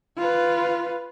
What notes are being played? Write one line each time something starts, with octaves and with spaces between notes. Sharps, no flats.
F4 B4